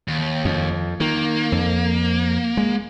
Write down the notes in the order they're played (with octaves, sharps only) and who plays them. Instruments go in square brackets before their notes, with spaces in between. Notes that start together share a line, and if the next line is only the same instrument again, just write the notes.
[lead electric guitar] D#2
[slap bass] F2
[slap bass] D#3 [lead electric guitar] A#3
[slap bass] F2
G#3